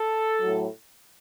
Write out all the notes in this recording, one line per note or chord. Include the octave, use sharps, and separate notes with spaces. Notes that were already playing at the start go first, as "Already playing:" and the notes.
Already playing: A4
A2 F#3